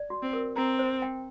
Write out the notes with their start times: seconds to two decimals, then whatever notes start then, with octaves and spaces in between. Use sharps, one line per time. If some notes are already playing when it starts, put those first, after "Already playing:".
Already playing: D5
0.10 F#4
0.22 C4
0.33 A#4
0.56 C4 A#5
0.79 C5
1.02 G5